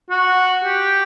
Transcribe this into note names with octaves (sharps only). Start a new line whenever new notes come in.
F#4
G4